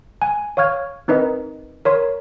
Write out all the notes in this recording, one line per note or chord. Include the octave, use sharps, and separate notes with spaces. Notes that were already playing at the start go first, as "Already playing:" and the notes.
G#5
C#5 F5 C#6 F6 G#6
C4 D#4 A#4 B4 D#5
A#4 C#5 C6